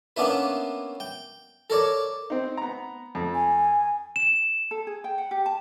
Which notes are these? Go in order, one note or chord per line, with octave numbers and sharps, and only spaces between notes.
A#3 B3 C#4 D4 E4 B4
G5
A4 A#4 C#5 D5
C4 D#4
B3 A#5
F2
G#5
E7
A4
G#4
G5
F#5
G4
A5